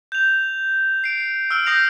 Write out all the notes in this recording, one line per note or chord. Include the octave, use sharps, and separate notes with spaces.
G6 F7
C7 D7
E6 F6 D7
D#6 F6 G6 A#6 C7 F7